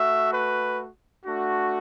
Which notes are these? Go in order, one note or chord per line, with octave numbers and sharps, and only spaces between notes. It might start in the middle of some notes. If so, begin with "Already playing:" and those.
Already playing: A3 F#4 E5
B4
A3 D4 F#4